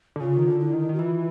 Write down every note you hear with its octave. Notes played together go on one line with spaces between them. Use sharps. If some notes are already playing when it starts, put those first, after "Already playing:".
D3
C#3 F4
D#3
D3
E4
D#3
D#3 F#4
E3 F4